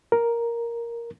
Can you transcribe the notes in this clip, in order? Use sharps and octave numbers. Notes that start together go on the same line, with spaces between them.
A#4